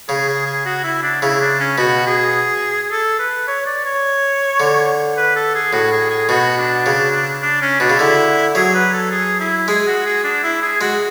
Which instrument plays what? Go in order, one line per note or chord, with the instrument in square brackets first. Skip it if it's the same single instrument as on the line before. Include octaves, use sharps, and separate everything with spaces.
[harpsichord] C#3 [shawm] G#4
[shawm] G#4
G#4
F#4
E4
D4
[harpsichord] C#3 [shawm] E4
[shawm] D4
C#4
[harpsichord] B2 [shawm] F#4
[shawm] G#4
A4
B4
C#5
D5
C#5
[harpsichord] D3
[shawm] B4
A4
G#4
[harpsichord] A2 [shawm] F#4
[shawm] G#4
G#4
[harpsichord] B2 [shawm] F#4
[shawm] D4
[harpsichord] C#3
[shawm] D4
C#4
[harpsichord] B2 [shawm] D4
[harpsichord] C#3
[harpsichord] D3 [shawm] E4
[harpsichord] F#3 [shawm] G#4
[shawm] B4
A4
G#4
E4
[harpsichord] G#3 [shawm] G#4
[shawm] F#4
G#4
D4
E4
G#4
[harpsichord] G#3 [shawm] F#4